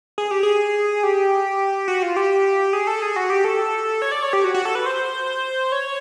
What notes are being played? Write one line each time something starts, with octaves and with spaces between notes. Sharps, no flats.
G#4
G4
G#4
G4
F#4
F4
G4
G#4
A4
G#4
F#4
G4
A4
C#5
D5
C#5
G4
F#4
F#4
A4
B4
C5
C#5